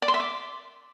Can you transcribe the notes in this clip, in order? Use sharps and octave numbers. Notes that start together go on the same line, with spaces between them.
D5
C6
E5
D6